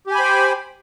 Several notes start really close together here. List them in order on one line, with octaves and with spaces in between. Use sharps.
G4 G#5 B5 C5 G5